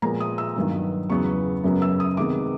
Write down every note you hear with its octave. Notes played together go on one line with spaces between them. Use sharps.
A#2 F3 G#3 B3 A#5
D#6
E6
G2 D#3 F#3 B3
E2 C#3 F#3 B3 C#6
F#2 C#3 F#3 B3
E6
D#6
C3 D#3 G#3 B3 D6